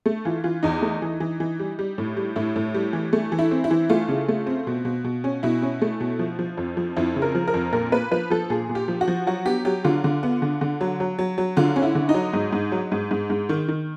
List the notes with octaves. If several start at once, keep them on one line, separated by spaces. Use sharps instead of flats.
A3
E3 F4
E3 F4
E2 D#4
A3
E3
E3
E3
G3
G3
A2
G3
A2 E4
A2
G3
E3
A3
E3
E4
C4
E4
E3
A3 F4
C#3
A3
C4
B2
B2
B2
C#4
B2 E4
C#4
A3
B2
F3
F3
F2
F3
F2 E4
C#3
A#4
F3
A#4
F2
A#2 A#4
A#3 B4
F3 B4
F3 A4
A#2 G#4
A#2
G4
F3
F#4
F3
F#3 F#4
B3 G4
F#3 G4
D3 F4
D3
B3
D3
D3
F#3
F#3
F#3
F#3
D3 F4
C#4
E4
D3
D#4
F#3
G#2
G#2
F#3
G#2
G#2
G#2
D#3
D#3